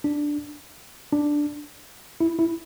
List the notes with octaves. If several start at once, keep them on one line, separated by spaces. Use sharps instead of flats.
D4
D4
E4
E4